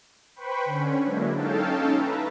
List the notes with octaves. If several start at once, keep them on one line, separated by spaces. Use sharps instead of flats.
B4 C5 G5 B5 C#6
D3 C#4
F#3 G#3 A#3 D4 E4
C#4 D#4 A4 F5 G5 A5
B4 E5 A#5